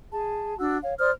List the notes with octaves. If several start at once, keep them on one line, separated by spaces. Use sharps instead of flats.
G#4 A5
D4 F#4 E6
C#5 F5
C5 D5 D#6 F6